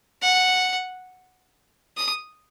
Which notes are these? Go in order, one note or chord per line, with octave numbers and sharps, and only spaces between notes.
F#5
D#6